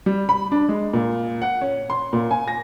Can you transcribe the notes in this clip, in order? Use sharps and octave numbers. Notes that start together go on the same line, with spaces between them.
G3
B5
D4
G#3
A#2
F#5
C#4
C6
A#2
G#5
A#6